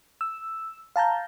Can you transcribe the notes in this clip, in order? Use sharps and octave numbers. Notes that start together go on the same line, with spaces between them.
E6
F5 A5 A#5 G6